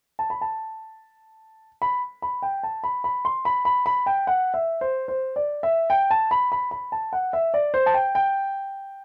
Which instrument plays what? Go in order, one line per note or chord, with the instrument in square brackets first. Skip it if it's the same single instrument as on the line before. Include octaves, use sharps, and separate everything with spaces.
[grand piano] A5
B5
A5
B5
B5
G5
A5
B5
B5
C6
B5
B5
B5
G5
F#5
E5
C5
C5
D5
E5
G5
A5
B5
B5
B5
A5
F#5
E5
D5
C5
A5
G5
G5